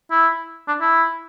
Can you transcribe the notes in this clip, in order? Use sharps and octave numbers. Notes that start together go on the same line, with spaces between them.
E4
D4
E4